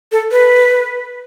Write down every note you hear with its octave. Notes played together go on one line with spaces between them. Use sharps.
A4
B4